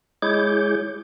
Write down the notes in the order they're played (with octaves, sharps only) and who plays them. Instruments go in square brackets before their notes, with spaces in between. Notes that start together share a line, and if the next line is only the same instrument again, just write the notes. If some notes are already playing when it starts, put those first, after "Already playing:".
[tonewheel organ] G#3 E4 G#4 C#5 D6 G6